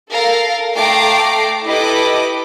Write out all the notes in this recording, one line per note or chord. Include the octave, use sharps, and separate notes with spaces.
A4 A#4 F5
A3 G5 A#5 D6 C7
E4 G4 A4 B4 D#5 D6